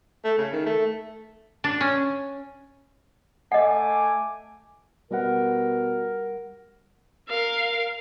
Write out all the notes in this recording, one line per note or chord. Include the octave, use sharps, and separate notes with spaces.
A3
C#3
D#3
A3
D4
C#4
A3 D#5 F#5 G#5 D6
B2 G3 A#4 F#5
A#4 F5